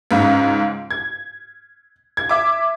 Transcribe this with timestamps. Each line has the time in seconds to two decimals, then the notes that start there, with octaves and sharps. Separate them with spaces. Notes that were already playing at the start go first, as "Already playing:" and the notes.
0.11 C#2 G#2 C#3
0.91 G#6
2.17 G#6
2.29 E5 D6